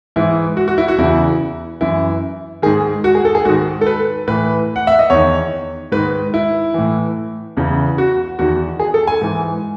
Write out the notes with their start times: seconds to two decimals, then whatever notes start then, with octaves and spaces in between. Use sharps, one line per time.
0.16 G#2 E3 E4
0.57 F#4
0.68 F#4
0.78 E4
0.88 F#4
0.98 E2 C#3 E3 E4
1.81 F#2 E3 E4
2.62 G#2 D#3 G#4
3.04 F#4
3.15 G#4
3.25 A4
3.35 G#4
3.45 G#2 D#3 F#4
3.81 A4
3.87 B4
4.27 A2 E3 B4
4.76 F#5
4.87 E5
4.99 D#5
5.10 E2 D#3 C#5
5.92 G#2 D#3 B4
6.34 E4
6.74 A2 E3
7.57 E2 C#3 E3
7.98 F#4
8.39 E2 D#3 F#4
8.80 G#4
8.94 A4
9.07 G#5
9.21 G#2 E3